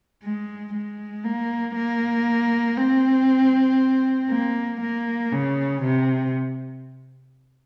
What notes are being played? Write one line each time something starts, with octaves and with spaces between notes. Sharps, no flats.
G#3
G#3
A#3
A#3
C4
A#3
A#3
C#3
C3